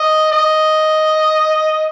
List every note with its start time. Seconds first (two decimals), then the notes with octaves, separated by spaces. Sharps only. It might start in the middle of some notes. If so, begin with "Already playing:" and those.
Already playing: D#5
0.32 D#5